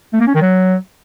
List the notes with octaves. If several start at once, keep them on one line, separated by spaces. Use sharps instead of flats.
A3
A#3
C#4
D#3
F#3